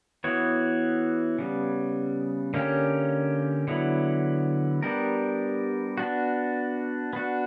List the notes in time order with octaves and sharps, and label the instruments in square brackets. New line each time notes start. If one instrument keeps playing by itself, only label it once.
[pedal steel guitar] E3 B3 F#4 C#5
C#3 G3 B3
D3 A#3 C#4 G4
D3 F#3 B3 E4
G3 B3 D4 G4 A#4
B3 D4 F#4
B3 D4 F#4